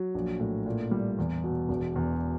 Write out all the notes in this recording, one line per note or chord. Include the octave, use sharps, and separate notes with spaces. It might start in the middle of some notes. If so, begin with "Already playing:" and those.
Already playing: F#3
A#1
A2
A#2
G3
E2
B2
E1
E2